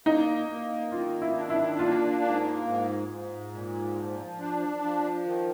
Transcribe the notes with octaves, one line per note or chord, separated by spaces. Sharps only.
A#3 D#4
A#3
D#3 F4
E4
D4
E4
A#3 F4
G#2
G#2
G#2
A#2
F3
D4
F3
D#3